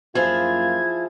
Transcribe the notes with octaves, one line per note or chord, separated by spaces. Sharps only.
F#2 F3 A#3 E4 F4 G#4 G#6